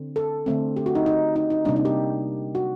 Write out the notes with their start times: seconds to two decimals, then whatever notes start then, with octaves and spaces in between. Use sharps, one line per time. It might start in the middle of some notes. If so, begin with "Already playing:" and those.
Already playing: D3 C4
0.16 A4
0.46 D3 A3 C4
0.76 G4
0.86 F#4
0.95 D#4
1.06 D#4
1.36 D#4
1.50 D#4
1.65 C3 G3 A#3 D4
1.76 D#4
1.85 G4
2.55 F#4